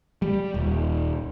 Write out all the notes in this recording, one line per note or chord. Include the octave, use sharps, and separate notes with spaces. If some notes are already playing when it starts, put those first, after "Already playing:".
G3
D#1